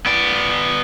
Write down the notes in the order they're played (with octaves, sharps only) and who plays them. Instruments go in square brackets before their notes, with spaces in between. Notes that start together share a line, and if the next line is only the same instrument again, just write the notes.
[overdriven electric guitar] B3 D5